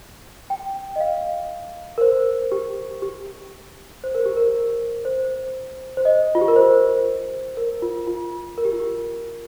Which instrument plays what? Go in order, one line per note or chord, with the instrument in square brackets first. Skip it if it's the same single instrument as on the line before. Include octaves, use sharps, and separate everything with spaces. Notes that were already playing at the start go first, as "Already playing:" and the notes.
[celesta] G5
D#5
F5
A#4
C5
G4
G4
C5
A#4
G4
A#4
C5
C5
D#5
F4
G4
A#4
C5
A#4
F4
F4
A#4
G4
F4
G4